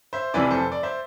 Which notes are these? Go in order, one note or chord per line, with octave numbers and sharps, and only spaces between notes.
C5 E5
F1 F2 C3 E3 B4 D5
A4 C5
D5
C5 E5